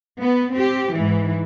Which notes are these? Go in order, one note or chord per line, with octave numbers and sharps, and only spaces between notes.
B3
C4 G4
G#2 E3